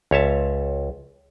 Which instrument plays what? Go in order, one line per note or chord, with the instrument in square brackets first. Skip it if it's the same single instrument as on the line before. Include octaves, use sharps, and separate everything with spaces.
[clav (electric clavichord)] C#2 C#5 E5 A5